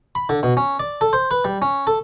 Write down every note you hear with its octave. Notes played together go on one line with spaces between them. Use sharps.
B5
D3
B2
C#4
D5
A4
C5
B4
G3
C#4
A4